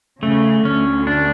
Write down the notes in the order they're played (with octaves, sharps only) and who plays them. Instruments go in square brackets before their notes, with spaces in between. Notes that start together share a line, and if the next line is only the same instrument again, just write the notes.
[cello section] C#3 [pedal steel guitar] A3
[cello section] D2 D3 [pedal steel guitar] C#4
[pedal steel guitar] D4